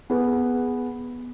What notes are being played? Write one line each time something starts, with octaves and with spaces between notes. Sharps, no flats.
B3 G#4 B4